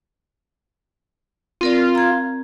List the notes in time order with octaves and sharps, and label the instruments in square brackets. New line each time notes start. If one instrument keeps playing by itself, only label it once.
[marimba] C4 A#4 D5 [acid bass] F4
[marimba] A#5 G#6